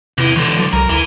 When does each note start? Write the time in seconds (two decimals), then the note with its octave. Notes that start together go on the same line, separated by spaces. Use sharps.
0.18 E2 C3 E3
0.36 C#2 D3 E3
0.58 F#3
0.73 C2 A#4
0.90 D2 E3